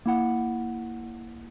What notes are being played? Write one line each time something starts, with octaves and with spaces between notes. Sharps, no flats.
A#3 E4 F#5